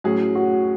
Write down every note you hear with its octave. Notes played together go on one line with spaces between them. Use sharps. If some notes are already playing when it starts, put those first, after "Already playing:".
A2 F#3 C#4 G#4
F#4